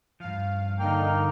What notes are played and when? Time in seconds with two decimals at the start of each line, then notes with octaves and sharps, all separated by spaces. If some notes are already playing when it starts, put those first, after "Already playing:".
0.20 G2 F3 F5
0.79 D3 A#3 D#4 G5 F6